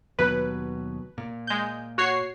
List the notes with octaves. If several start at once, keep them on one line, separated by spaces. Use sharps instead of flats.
D#2 B2 F#3 B4
A#2
G#3 G6
F#4 C#5 C7